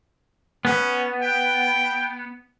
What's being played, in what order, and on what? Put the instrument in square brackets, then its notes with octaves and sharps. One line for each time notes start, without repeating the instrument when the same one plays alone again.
[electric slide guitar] B3 [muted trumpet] C#4
[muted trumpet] G5